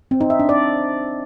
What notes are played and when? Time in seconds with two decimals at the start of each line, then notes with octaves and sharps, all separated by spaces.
0.11 C4
0.21 D#4
0.30 E5
0.40 D4
0.49 D5